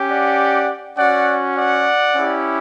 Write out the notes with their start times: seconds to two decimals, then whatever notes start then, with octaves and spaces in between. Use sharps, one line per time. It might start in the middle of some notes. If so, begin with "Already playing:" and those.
Already playing: C#4 G4
0.09 D5 F#5
0.97 C#4 F#4 D5 F#5
1.56 D5 F#5
2.15 C#4 E4 G4